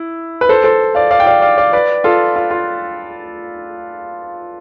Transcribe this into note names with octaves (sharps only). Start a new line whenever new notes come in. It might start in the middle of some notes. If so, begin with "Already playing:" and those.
Already playing: E4
B4
A4 C5
A4 C5
D5 F5
D5 F5
G5
D5 F5
D5 F5
D5 F5
B4 D5
F4 A4
F4
F4